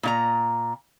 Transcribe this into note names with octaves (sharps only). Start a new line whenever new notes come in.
A#2 E4 A#5